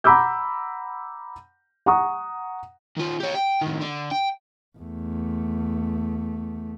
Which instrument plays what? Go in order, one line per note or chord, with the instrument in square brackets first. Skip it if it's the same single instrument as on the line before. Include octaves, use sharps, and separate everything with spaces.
[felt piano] F#5 A#5 B5 D6 E6 G6
F#5 A#5 C#6 D#6
[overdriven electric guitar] D#3 F4
G4 C#5
G5
A2 D#3
D3
G5
[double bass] E2 A3